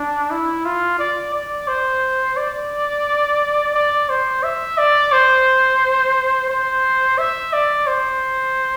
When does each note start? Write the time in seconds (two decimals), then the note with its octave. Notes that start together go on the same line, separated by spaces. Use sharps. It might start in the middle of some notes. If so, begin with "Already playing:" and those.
Already playing: D4
0.31 E4
0.65 F4
0.99 D5
1.34 D5
1.68 C5
2.37 D5
3.75 D5
4.09 C5
4.43 E5
4.78 D5
5.12 C5
6.50 C5
7.18 E5
7.53 D5
7.87 C5